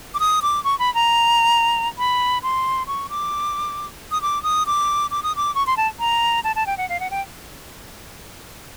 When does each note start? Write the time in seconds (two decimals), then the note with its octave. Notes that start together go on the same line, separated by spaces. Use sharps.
0.14 D6
0.20 D#6
0.42 D6
0.64 C#6
0.79 B5
0.94 A#5
1.98 B5
2.43 C6
2.87 C#6
3.09 D6
4.11 D#6
4.22 D6
4.43 D#6
4.66 D6
5.11 D6
5.23 D#6
5.36 D6
5.55 C#6
5.67 C6
5.77 A5
5.99 A#5
6.44 A5
6.56 A5
6.66 G5
6.78 F#5
6.89 F5
7.00 F#5
7.11 G5